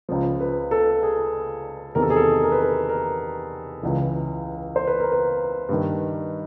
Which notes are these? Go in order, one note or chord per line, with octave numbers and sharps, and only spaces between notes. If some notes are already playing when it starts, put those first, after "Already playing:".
C#2 C#3 F3
B4
A4
G#4
E2 C3 D#3 A#4
A4
G#4
A4
A#4
B4
A#4
A#4
C#2 C#3 E3
C5
B4
A#4
B4
G2 D#3